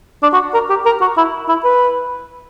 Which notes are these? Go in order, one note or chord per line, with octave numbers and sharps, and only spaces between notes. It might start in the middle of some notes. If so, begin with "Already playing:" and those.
D4
F#4
A#4
G4
A#4
F#4
E4
E4
B4